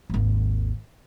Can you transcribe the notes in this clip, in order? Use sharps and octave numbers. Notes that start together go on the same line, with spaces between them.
G#1 D#2